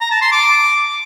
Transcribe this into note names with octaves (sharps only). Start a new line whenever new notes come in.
A#5
A5
C6
D6